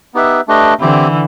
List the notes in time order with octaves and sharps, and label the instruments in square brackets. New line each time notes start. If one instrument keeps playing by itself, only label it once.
[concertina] B3 D#4 G4 B4 E5
A3 D4 G4 B4 D#5
[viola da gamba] D3 E3 [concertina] C4 E4 G4